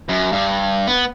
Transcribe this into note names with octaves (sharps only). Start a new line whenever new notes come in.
F#2
G2
B3